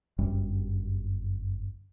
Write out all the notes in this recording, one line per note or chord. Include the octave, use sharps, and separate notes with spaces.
G1 F#2 G3